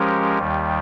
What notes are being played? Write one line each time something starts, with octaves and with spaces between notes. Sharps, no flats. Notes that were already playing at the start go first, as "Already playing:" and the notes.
Already playing: F3 G#3 C#4 G4 A#4
D#2 D#3 G3